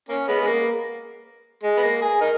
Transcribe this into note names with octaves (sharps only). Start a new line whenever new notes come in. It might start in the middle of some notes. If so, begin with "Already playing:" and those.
A#3 C#4
G#3 B3
G#3
A#3
G#3
B3
A#3
G#4
D#4 A#4